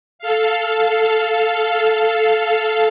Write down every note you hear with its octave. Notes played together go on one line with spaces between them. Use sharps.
A4 F5